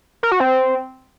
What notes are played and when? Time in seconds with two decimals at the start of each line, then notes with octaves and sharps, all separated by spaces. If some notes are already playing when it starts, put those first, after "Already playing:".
0.23 A#4
0.32 F#4
0.40 C4